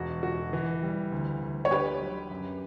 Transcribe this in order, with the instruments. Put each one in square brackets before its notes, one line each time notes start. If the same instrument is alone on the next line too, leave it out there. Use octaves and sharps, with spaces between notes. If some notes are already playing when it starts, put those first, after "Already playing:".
Already playing: [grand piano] E1 F#4
F#4
E3
G3
D2
D2
[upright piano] C#5
[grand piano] D3 [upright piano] G4 B4
[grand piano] F#3
F#2